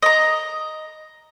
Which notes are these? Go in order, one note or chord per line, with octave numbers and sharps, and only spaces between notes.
D#5 A#5